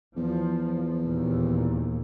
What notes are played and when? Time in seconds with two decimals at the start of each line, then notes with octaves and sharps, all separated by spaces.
0.16 E2 F3
1.00 D#2 A#2